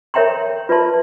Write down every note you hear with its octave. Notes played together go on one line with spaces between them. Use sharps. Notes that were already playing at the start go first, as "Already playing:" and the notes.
A#4 C#5 E5 G5 A#5 C6
F4 B4 D5 E5 A5 C6